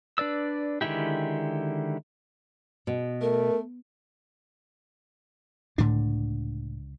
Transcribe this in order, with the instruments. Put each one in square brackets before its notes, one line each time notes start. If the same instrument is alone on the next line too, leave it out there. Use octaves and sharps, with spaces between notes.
[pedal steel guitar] D4 B4 D5 E6
D3 D#3 G#3 E4 G4
[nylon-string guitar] B2
[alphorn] A3 [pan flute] A#4
[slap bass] C#2 D3 D4 [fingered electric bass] A2